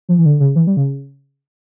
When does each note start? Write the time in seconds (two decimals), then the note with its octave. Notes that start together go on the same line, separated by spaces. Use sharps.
0.09 F3
0.18 E3
0.25 D3
0.40 C#3
0.56 E3
0.67 G3
0.77 C#3